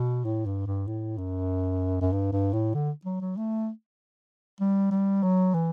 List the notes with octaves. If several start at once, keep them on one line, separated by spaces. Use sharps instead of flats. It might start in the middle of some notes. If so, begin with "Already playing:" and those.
Already playing: B2
A2
G2
G2
A2
F#2
F#2
G2
G2
A2
D3
F#3
F#3
A3
G3
G3
F#3
E3